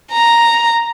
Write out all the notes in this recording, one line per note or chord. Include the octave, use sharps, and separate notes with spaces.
A#5